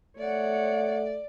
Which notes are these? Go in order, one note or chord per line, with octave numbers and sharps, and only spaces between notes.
A3 C#5 D5 F#5